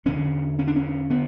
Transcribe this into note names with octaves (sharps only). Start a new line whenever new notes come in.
E2 D3 C#4
C#4
D4
C#4
D3 B3